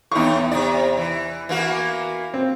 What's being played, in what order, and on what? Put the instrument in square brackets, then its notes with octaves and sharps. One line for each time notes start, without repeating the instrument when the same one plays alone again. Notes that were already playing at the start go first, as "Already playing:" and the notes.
[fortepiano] E2 C#6 [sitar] A2 D#4
[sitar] C3 D5
E3
E3 A#3 F#4
[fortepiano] C4